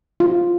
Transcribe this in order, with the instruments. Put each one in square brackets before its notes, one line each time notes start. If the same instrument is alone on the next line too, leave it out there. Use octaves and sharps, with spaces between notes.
[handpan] F4